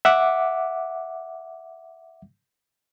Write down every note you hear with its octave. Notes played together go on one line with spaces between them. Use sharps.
E5 F#5 D6